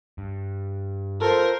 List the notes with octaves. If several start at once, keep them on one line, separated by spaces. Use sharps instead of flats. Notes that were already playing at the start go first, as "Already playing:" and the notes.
G2
F4 A4 A#4 C5